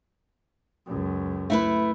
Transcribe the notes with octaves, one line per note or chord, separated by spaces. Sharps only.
C#2 F#2
A3 E4 B4